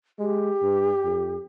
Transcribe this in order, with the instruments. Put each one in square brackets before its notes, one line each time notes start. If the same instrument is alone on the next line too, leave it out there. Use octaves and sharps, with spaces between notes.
[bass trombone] G#3 [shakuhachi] G4
[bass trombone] G2
F2